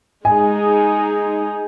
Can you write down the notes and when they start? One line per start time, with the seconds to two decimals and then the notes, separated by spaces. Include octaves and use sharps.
0.25 G#3 D#4 G#4 G#5